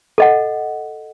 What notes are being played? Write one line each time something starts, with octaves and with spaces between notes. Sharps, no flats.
A4 D#5 F#5